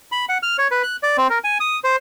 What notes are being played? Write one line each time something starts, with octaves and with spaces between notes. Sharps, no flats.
B5
F#5
F6
C#5
B4
F#6
D5
C4
A#4
G#5
D#6
C5